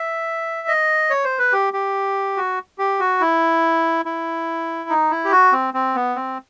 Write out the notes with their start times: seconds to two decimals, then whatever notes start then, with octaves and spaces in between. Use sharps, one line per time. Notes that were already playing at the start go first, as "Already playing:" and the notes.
Already playing: E5
0.68 D#5
1.10 C#5
1.24 C5
1.39 B4
1.53 G4
1.73 G4
2.37 F#4
2.78 G4
3.00 F#4
3.21 E4
4.05 E4
4.89 D#4
5.11 E4
5.25 G4
5.32 F#4
5.52 C4
5.74 C4
5.95 B3
6.16 C4